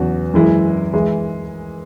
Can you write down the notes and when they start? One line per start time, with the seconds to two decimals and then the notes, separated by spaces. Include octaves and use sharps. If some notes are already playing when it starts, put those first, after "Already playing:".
Already playing: E2 C#3 F#3 B3 F#4
0.34 F#2 E3 G#3 E4
0.94 E3 G#3 E4